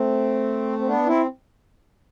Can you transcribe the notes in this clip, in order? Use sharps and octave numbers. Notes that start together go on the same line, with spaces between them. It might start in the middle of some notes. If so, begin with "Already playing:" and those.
Already playing: A3 C4
C4
B3 D4
C4 E4